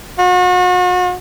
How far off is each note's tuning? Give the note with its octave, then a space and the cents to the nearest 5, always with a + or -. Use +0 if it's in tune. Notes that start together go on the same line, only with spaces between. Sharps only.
F#4 -40